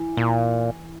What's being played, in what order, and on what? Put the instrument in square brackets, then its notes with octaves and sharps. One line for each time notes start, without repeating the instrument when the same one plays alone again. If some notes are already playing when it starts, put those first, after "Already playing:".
Already playing: [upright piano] E3
[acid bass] A#2